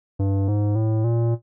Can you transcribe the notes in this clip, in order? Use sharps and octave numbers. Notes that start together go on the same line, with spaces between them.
G2
G#2
A2
A#2